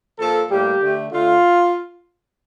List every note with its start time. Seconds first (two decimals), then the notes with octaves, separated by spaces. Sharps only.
0.19 A#2 F3 A#3 A4
0.50 A2 G3 A#3 G4
0.81 D3 A3
1.11 D3 A3 F4